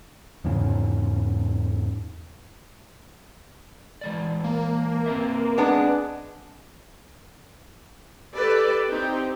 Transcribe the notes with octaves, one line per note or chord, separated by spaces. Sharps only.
E2 G#2 C#3 C#4
E3 G#3 D5
A#3
C4 B4 E5
G#3 B3 D4
G4 A4 B4 D5
C4 D#4 G4